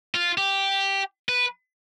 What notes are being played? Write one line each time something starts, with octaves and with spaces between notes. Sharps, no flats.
F4
G4
B4